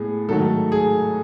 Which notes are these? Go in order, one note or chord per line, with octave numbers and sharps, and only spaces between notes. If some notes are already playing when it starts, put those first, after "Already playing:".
Already playing: A2 G#3 B3 G#4
G#2 D#3 F#3 A3 A4
G#4